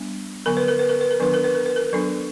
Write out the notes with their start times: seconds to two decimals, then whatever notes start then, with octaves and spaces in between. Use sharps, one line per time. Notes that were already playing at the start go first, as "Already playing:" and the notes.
Already playing: G3 B3 D4
0.46 D3 F#3 B3 A#4
0.57 B4
0.68 A#4
0.79 B4
0.89 A#4
1.01 B4
1.11 A#4
1.20 D#3 F#3 B3 D4 B4
1.34 A#4
1.44 B4
1.55 A#4
1.66 B4
1.76 A#4
1.93 F#3 B3 D4 A4